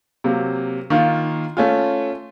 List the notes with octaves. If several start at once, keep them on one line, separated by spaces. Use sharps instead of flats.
C3 F#3 A#3
D#3 A#3 F4
A3 C#4 F4